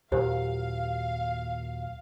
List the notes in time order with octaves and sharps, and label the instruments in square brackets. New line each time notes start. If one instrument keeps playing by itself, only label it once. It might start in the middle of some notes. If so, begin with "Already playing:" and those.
[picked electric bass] D#2 A#2 F#3 [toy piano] G4 C5 [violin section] F5